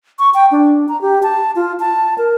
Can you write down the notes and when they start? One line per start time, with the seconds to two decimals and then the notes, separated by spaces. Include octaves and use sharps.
0.19 C#6
0.34 G5
0.52 D4
0.89 A#5
1.02 G4
1.23 A5
1.56 F4
1.80 A5
2.18 A#4